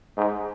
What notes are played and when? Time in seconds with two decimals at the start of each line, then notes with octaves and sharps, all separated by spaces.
0.17 G#2